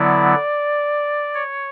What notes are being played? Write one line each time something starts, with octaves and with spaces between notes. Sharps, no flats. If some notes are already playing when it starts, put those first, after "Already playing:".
Already playing: D3 F#3 B3 E4 D5
C#5